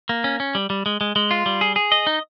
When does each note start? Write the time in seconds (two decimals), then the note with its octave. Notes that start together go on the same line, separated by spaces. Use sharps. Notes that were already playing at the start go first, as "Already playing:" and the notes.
0.09 A#3
0.24 C#4
0.40 C#4
0.55 G3
0.70 G3
0.86 G#3
1.01 G#3
1.16 G#3
1.31 F4
1.46 G3
1.61 G#4
1.76 G#4
1.92 D#5
2.07 D#4